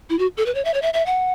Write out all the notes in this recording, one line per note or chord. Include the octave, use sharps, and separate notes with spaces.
E4
F#4
A4
B4
C#5
E5
C#5
E5
E5
F#5